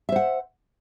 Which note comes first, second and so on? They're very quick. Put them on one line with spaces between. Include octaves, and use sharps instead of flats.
E5 C5 F#5